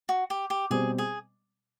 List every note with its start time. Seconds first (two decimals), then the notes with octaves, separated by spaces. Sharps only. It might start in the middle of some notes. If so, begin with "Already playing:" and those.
0.09 F#4
0.30 G4
0.50 G4
0.70 B2 G3 C4 G#4
0.98 G#4